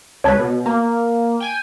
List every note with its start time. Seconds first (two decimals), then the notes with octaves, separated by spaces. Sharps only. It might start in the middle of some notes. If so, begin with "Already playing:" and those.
0.24 C#2 B4 C#5 A5 G#6
0.39 B2
0.66 A#3
1.40 G5 G#5